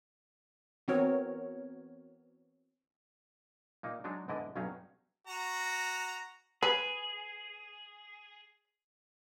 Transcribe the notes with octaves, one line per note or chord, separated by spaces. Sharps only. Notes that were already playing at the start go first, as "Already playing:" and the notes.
E3 B3 C4 F#4 A#4 C#5
A#2 A#3 D#4
F#3 G#3 D4 D#4
E2 G#2 D3 E4 D5 D#5
B1 G2 F#3 C#4 D#4 F5
F#4 A#5
G#4 B4